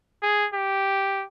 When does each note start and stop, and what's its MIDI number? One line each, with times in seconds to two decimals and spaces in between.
0.23 0.47 68
0.53 1.25 67